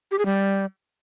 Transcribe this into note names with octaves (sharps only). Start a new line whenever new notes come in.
G4
G#4
G3